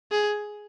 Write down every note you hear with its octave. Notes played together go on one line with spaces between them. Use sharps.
G#4